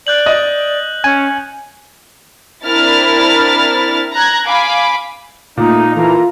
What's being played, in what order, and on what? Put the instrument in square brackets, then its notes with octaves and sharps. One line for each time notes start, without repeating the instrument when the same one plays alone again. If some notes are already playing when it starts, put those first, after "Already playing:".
[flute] D5 [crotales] F#6 G6 F#7
[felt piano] D#5
[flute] C#4 [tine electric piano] G#5
[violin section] C4 D4 E4 A#4 F6 A6
A#5 F#6 G#6
F5 G#5 B5 D6
[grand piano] A#2 [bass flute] A3 [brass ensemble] D#4
[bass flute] E3 [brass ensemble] A#3 A4 A#5 [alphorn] F4